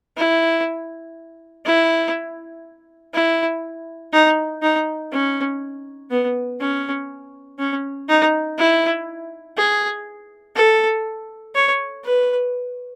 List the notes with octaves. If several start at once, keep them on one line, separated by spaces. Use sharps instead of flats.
E4
E4
E4
D#4
D#4
C#4
B3
C#4
C#4
D#4
E4
G#4
A4
C#5
B4